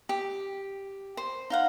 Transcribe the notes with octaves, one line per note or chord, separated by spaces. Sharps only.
G4
C5
D#4 F5 F#5